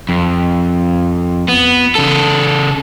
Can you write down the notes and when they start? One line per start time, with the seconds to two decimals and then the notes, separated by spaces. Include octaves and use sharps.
0.09 F2
1.48 B3
1.95 C#3 A4